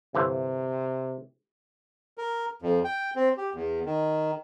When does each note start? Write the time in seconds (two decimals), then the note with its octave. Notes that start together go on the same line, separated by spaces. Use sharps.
0.14 G1 C3 E3 C5
2.18 A#4
2.62 F2
2.84 G5
3.16 C4
3.37 G4
3.54 E2
3.86 D#3